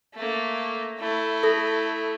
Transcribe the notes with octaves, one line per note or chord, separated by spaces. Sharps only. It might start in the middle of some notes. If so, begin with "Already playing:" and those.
A3 A#3
A3 E4
A4